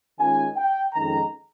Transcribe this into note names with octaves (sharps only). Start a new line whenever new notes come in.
D#3 G#3 C#4 F4 G#5
G5
F2 D#3 G#3 C#4 A#5